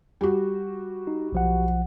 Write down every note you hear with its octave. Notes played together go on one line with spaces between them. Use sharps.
G3 F#4
D#4
B1 F3 F#5